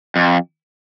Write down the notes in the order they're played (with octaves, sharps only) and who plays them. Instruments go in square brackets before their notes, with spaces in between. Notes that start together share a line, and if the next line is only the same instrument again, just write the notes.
[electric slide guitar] F2